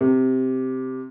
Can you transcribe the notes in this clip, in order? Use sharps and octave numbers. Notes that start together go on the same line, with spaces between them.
C3